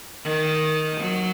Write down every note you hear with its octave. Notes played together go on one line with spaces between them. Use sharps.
D#3
F#3